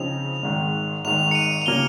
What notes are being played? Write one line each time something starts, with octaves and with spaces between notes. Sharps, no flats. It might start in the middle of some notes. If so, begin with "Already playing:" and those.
Already playing: C#3 F3 C4 D#4 F7
G#1 G#2 D#3
G#1 G#2 D#3 F7
C#7
D#7
F7
C#3 G3 A#3 G7